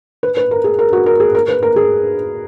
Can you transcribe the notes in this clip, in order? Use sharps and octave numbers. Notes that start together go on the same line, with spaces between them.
B4
B4
A#4
G#4
A#4
F#4
A#4
G#4
A#4
B4
A#4
G#4